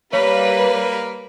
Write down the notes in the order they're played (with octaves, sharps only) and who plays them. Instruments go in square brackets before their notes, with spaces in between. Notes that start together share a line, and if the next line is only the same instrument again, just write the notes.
[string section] G3 B4 [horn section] A#3 [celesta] C#5